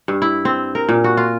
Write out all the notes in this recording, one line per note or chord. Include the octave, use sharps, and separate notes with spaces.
G2
E4
C4
A#4
A#2
F#4
F4